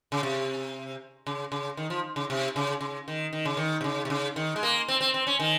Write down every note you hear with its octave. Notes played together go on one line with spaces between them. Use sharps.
C#3
C3
C#3
C#3
D#3
F3
C#3
C3
C#3
C#3
D#3
D#3
C#3
D#3
C3
C#3
C3
C#3
D#3
G#3
A#3
C4
C4
C4
C#4
D#3